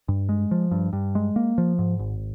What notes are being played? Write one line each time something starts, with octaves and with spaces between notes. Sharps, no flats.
G2
G#3
F3
G2
G2
G#3
A#3
F3
G#2
G#1